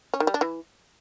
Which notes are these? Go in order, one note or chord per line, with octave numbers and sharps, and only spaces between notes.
C#4
D#3
G3
D4
E3